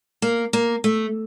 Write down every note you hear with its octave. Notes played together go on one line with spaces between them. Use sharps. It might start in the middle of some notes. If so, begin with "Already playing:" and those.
A#3
A#3
A3